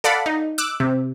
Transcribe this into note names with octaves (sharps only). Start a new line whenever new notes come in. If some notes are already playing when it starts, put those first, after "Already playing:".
A4 D5 F5 F#5 B5
D#4
D6 E6 F#6
C3